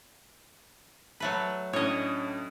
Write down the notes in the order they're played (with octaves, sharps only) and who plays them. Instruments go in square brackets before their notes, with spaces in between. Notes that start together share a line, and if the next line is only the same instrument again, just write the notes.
[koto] F#3 A3 B4
[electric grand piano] A2 C#4 D4 [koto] C#5 D#5